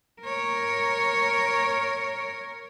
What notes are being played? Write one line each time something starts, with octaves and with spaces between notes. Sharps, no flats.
A#4 C#5